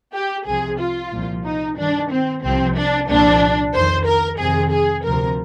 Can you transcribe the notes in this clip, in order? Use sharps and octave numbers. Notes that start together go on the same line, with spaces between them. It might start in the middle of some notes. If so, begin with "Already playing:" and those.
G4
C2 C3 F3 G#4
F4
C2 A#2 F3
D#4
G2 D#3 D4
C4
C2 C3 F3 C4
D4
C2 A#2 F3 D4
F2 D#3 C5
A#4
F2 C3 D#3 G#4
G#4
D2 C3 F3 A#4